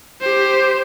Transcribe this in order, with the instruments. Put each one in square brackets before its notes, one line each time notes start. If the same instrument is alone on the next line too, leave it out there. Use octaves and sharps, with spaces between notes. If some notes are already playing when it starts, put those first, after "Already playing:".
[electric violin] G4 C5